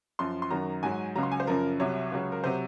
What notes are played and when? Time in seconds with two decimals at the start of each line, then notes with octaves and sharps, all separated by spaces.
0.19 F#2 F3 C6
0.42 C6
0.50 F#2 D#3 F#3 A#5
0.83 G#2 F#3 G#5
1.16 C#2 C#3 F#3 A#5
1.23 C6
1.32 G#5
1.40 C5
1.47 F#2 C#3 F3 A#4
1.80 C2 C3 F#3 C#5
2.12 C#2 C#3 F#3
2.32 A#4
2.44 C3 F#3 C5